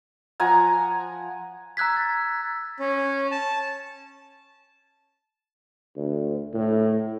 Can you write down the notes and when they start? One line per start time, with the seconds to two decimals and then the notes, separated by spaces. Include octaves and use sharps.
0.40 F3 F#5 G#5 A#5
1.77 A#5 E6 F#6 G#6 B6
1.97 A6
2.79 C#4
3.31 A5
5.96 D2
6.53 A2